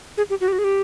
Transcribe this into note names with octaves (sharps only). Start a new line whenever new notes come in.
G#4
G4
F#4
G4
F#4
G#4
G4